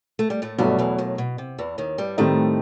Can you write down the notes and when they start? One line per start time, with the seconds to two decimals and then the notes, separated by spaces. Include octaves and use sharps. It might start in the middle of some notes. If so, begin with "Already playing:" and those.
0.19 A3
0.30 G3
0.42 A2 A3
0.58 G2 B2 F#3 G3 A3
0.79 E2 E3
0.98 D#2 D#3
1.18 B2
1.38 C3
1.58 E2 E3
1.78 D#2 D#3
1.98 G2 G3
2.18 A2 D#3 G3 A3 C4 D#4